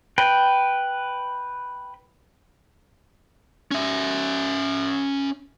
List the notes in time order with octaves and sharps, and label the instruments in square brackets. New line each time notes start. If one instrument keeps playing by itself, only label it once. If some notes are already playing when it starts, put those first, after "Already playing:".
[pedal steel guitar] B4 G5
[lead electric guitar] C#4 E5